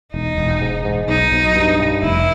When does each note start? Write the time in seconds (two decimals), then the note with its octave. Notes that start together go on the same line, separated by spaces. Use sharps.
0.14 E1 D#4
0.38 E1
0.62 G#2
0.85 G#2
1.08 B1 D#4
1.32 B1
1.56 G2
1.79 G2
2.03 F1 E4